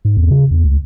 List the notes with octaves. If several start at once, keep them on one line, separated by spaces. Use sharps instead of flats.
G#2
E2
C#3
E2
C#2